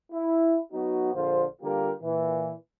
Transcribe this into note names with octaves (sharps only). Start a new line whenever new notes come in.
E4
F#3 B3 D#4 F#4
A#1 D3 F4 C5
D3 G3 A#3 F4 G4 A#4
A#2 E3